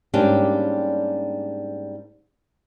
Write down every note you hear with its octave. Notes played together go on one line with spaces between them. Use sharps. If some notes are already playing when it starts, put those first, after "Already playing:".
G#2 G3 A#3 C#4 D4 G4